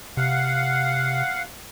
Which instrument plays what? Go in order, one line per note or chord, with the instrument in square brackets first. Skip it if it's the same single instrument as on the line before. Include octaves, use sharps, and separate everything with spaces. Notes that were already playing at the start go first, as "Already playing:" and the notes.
[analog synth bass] C3 [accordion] F5 F#5